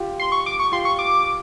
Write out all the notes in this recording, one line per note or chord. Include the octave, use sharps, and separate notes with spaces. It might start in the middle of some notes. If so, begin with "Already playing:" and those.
Already playing: F4 G4
C6
C#6
D6
C#6
F4 G4 C6
C#6
D6